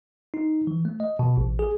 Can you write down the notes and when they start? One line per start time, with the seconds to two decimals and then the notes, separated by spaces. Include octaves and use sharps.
0.34 D#4
0.67 E3
0.85 A3
1.00 D#5
1.19 B2
1.37 A1
1.59 G#4